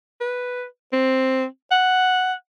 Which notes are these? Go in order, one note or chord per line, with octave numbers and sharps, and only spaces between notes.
B4
C4
F#5